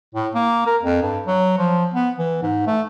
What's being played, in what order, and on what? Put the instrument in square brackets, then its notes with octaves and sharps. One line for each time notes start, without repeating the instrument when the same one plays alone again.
[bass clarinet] A2
A#3
A#4
F2
G2
F#3
F3
B3
E3
G#2
A3